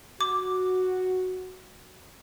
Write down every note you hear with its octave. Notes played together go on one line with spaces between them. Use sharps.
F#4 D6